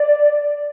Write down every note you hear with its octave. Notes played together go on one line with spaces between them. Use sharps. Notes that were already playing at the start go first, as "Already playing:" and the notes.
Already playing: D5